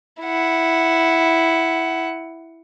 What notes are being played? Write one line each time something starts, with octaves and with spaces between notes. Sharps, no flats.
E4 F#5